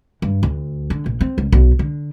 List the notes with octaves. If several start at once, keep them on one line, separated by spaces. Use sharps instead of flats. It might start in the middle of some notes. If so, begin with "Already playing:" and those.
G2
D2
D3
A#1
C4
C#2
B1
D3